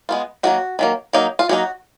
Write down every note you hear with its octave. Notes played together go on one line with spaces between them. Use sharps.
G#3 B3 F4
D#3 F#3 A#3 F#4
D#3 F#3 A#3
F#3 A#3 D#4
F4
F#3 A#3 D#4 F#4